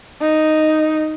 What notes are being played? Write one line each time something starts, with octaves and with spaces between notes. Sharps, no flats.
D#4